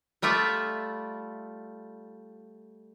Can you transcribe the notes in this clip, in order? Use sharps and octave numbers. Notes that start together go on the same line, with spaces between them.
G3 A3 F4 D5 E5